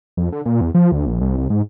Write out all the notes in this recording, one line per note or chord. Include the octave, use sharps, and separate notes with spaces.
F2
D3
A#2
E2
F3
D2
A#1
C2
C2
G#2